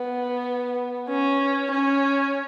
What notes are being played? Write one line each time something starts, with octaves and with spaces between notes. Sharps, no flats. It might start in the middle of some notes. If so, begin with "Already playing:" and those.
Already playing: B3
C#4
C#4